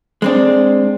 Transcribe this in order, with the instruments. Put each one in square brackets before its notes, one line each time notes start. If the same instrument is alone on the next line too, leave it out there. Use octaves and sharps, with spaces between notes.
[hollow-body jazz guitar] G#3 C4 D4